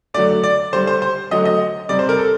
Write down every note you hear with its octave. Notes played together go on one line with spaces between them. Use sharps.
D3 F#3 A3 D5
D5
D3 G3 C5
C5
C5
D3 F#3 A3 D#5
D#5
C3 G3 D5
C5
A#4
A4